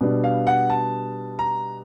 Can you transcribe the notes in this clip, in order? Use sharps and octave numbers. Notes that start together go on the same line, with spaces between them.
B2 G3 B3 D4
F5
F#5
A5
A#5